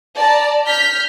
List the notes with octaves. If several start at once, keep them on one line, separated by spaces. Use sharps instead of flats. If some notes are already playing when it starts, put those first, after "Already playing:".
D5 A5 A#5
F6 G6 B6